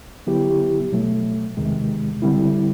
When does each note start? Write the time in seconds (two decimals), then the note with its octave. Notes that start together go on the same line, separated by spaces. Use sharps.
0.27 D3 F#3 B3 E4 G4
0.92 B2 F#3 A3
1.57 E2 C3 D#3 G#3
2.22 D3 G3 C4 E4